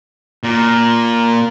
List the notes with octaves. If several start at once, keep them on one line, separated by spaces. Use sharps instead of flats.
A#2